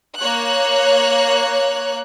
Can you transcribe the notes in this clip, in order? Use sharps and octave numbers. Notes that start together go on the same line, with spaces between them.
A#3 C#5 F#6